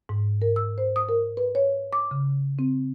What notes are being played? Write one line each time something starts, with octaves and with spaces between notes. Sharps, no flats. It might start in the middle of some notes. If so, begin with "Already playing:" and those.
G#2
A#4
E6
C5
D#6
A#4
B4
C#5
D6
C#3
C4